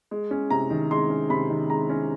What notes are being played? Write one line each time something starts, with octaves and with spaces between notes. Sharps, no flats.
G#3
C#4
C3 A#5
D#3
G#3 C6
C#4
C3 B5
D#3
G#3 A#5
C#4